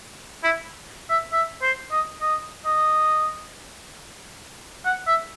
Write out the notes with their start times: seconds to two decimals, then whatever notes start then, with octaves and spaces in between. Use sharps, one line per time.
0.44 E4
1.10 E5
1.32 E5
1.62 C5
1.91 D#5
2.21 D#5
2.65 D#5
4.85 F#5
5.07 E5